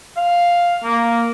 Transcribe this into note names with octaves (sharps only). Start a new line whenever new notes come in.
F5
A#3